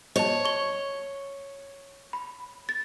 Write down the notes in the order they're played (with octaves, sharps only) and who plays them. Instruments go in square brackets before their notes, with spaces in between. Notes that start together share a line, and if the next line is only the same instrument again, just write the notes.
[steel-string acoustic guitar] C#5 [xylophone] D#5 A5
[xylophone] C#6 G7
B5
A6